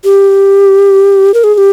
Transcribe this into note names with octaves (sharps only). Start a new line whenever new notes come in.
G4
A#4
G#4
G#4
G4